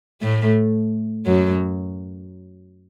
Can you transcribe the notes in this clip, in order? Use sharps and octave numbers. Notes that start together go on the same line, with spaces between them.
A2 A3
F#2 F#3